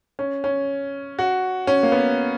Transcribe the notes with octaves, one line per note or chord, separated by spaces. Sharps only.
C#4
C#4
F#4
C#4
A#3
B3